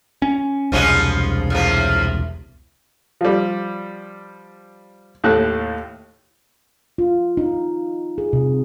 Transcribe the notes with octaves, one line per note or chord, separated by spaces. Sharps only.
C#4
E1 C2 F3 G#3 C#4
A2 F3 A#3
F3 G3
D#2 A2 A3 A5 F#6
F4
D#4
G#4
C3